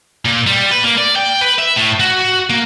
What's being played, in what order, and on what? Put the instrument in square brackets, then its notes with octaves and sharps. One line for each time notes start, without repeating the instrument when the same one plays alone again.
[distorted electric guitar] A#2
G3
B4
A#3
D5
G5
B4
E5
A2
F#4
A#3